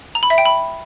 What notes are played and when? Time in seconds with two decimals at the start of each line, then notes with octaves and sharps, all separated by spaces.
0.15 A#5
0.23 B5
0.30 E5
0.38 G5
0.45 B5